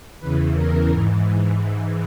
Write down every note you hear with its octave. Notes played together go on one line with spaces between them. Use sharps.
E2 C#3 E3 B4
A#4
G#2 E3
G#2 E3